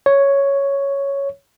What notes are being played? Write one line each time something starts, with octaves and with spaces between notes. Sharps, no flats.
C#5